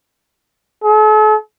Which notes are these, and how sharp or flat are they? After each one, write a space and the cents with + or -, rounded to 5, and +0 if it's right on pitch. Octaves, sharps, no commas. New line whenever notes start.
A4 -45